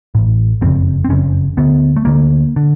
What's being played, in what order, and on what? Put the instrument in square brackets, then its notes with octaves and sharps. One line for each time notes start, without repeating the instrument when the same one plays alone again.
[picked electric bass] A1 A2
F#1 F2 C#3 C4
C4
F#1 F2 C#3 C#4
D2 D3 B3
A3
D2 D3 A#3
D3